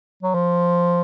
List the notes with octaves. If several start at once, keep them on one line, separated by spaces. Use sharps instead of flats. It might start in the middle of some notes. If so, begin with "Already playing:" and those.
F#3
F3